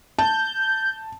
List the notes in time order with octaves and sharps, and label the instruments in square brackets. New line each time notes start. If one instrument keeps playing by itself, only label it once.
[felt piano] A5 [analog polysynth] G6